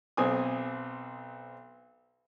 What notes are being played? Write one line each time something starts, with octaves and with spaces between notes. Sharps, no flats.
B1 C4 G#5 D#6